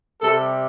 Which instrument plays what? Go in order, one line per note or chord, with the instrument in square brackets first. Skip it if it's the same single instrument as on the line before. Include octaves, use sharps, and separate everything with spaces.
[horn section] C3 G3 A4